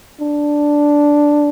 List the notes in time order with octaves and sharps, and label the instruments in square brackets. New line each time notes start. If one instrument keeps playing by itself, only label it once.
[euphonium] D4